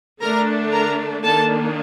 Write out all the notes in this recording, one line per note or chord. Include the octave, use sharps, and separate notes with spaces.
D3 A3 D4 A#4 A#5
A#4 A#5
D#3 A#3 D4 A4 A5